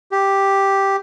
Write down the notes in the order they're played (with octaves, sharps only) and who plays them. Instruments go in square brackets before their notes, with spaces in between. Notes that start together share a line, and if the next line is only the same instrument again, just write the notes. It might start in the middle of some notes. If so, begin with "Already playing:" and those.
[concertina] G4